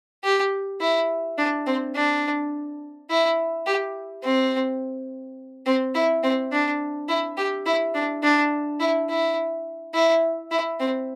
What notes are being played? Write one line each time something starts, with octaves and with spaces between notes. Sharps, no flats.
G4
E4
D4
C4
D4
E4
G4
C4
C4
E4
C4
D4
E4
G4
E4
D4
D4
E4
E4
E4
E4
C4